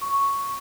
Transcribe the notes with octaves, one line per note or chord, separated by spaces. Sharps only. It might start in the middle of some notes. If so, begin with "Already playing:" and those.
C#6